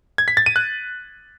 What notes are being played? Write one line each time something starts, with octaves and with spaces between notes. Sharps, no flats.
G#6
B6
A6
D#7
F#6